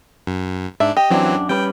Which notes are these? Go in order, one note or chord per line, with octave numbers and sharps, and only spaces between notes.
F#2
G#2 D4 E5
G4 D#5
F#2 E3 F#3 C4 D4
G3 C#4 B4 G5